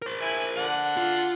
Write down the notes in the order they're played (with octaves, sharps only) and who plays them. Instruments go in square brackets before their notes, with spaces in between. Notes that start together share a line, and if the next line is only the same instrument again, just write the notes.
[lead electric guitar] A#4 C5
[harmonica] E4 G#5
D3 D4 F#5
[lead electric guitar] F4